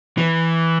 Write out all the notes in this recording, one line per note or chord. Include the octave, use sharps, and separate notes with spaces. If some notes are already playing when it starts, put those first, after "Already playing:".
E3